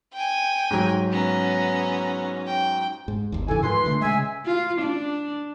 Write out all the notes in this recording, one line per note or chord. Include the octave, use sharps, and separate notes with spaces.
G5 G#5
G#2 F#3
B3 C#4 A#5
G5
G#2
G1 D#2
G2 C#3 E3 A4 G#5
G#2 D#3 F3 B4 C6
D3 A3
C#3 G#3 E5 G#5
F4
D4